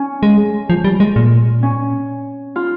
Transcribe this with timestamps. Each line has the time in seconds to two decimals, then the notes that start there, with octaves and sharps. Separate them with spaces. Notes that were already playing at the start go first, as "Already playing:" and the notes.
Already playing: C#4
0.23 G#3
0.70 F3
0.84 G3
1.00 G#3
1.16 A#2
1.63 C#4
2.56 F4